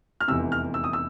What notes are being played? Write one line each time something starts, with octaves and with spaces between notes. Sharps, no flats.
F6
F1 E2 C3 E6
F6
E6
D#6
E6